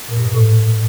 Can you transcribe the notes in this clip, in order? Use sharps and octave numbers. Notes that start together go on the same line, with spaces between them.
A#2
G2
B2
A2